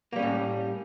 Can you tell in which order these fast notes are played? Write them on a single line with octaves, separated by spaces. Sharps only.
A#3 G3 C#4 A2